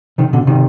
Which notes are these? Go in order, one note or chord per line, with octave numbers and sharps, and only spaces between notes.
C3 D#3
B2 D3
C3 D#3